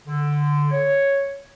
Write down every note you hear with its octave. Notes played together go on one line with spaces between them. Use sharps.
D3
C#5